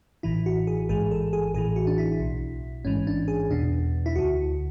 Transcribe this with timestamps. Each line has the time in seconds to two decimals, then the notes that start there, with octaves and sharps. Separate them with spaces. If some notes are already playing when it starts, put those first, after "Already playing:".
0.23 A1 A2 E3 E4
0.46 F#4
0.67 G#4
0.89 A1 G#2 E3 G#4
1.11 A4
1.33 G#4
1.54 A1 A2 E3 G#4
1.76 F#4
1.87 D4
1.98 E4
2.20 B1 B2
2.85 A1 G#2 E3 C#4
3.07 D4
3.28 G#4
3.50 E2 B2 D4
4.06 E4
4.16 D2 D3 F#4